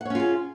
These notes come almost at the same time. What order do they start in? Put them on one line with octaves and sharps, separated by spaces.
F#5 C#5 C#4 F4 G#4